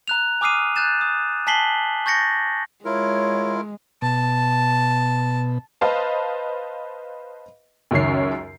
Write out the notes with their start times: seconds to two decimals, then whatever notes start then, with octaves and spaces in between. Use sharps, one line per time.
0.08 A#5 F#6 F7
0.41 G#5 D6 D#6 F6 C7 D#7
0.76 F#6 G6 A6 E7
1.01 D#6
1.47 G#5 A5 B6 C7 F#7 G7
2.06 C#6 G6 A6 A#6 C#7
2.85 G#3 E4 F4 A#4 C#5
4.02 B2 A5
5.81 B4 C5 D#5 F5 A5
7.91 C#2 F#2 D#3 C#5 C7